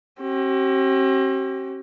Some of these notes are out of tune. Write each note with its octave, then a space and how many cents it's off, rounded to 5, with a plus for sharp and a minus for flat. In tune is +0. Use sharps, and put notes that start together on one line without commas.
C4 +45 G4 -45